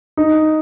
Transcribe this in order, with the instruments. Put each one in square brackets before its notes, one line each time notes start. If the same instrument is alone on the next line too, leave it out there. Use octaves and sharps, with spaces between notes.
[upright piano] D#4